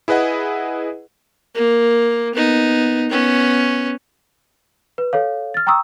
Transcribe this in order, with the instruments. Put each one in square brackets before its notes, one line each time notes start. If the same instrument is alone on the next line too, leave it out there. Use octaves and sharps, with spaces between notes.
[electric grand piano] E4 G#4 B4 D#5 F#5
[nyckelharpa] A#3
B3 D#4
B3 C#4
[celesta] B4
A4 C#5 F5
F6 A6
G5 A#5 C#6 D#6 E6